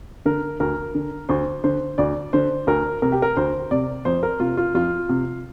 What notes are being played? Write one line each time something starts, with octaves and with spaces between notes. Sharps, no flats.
D3 A#4
D2 A#4
D3
D2 C5
D3 C5
D2 D5
D3 C5
D2 A#4
C3 A#4
G4
A#4
D2 C5
C3 D5
F2 C5
A#4
C3 F4
F4
F2 F4
C3